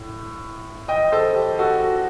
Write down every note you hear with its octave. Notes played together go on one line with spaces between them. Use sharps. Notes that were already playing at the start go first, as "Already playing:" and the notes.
Already playing: A2
D#5 G5
A4 C5
G4
F#4 A4